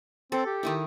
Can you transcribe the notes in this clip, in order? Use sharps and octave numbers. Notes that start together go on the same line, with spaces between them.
C4 A4
G4
D#3 D#4 E4